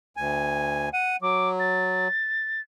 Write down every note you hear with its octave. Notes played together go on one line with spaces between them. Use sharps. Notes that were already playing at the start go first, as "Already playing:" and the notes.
D2 G#5
F#5 D#7
F#3 D6
A6